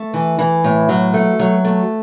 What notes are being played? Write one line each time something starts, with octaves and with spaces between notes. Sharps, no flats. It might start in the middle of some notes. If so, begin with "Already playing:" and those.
Already playing: A3
E3
E3
A2
F#3
A3
F#3
A3